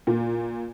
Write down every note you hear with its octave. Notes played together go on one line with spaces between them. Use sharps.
A#2